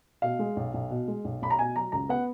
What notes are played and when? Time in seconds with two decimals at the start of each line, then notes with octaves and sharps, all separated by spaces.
0.22 B2 F5
0.39 G#3
0.56 B1
0.74 B1
0.90 B2
1.08 G#3
1.24 B1
1.42 B1 B5
1.50 A#5
1.59 B2 G#5
1.76 F#3 A#5
1.92 C#2 A#5
2.09 B3 F#5